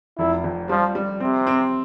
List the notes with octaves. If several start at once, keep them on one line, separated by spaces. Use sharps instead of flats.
F1 E4
F2
F3 G3
G3
C3 C4
C4